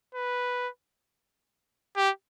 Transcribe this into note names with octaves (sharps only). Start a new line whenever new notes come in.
B4
G4